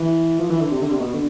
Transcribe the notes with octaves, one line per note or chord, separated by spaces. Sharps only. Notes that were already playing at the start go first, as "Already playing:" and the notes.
Already playing: E3
F3
E3
D3
C3
D3
C3
B2
D3